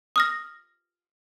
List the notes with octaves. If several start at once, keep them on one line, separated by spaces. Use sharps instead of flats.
D#6 F6 A#6